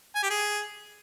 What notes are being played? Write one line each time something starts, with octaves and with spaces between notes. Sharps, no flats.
G#5
G4
G#4